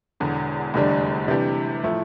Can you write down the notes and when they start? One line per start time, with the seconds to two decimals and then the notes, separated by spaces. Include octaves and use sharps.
0.20 E1 E2 D3
0.74 F1 E2 D3 G3 D4
1.28 C3 E3 G3 D4 G4
1.83 A2 F3 A3 E4